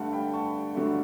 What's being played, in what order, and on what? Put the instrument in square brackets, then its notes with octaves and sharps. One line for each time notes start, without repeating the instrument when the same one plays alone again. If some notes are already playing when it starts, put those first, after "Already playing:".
Already playing: [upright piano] G2 D3 A3 F#5 A5
G5 B5
A5 C#6
G2 D3 F#3 A3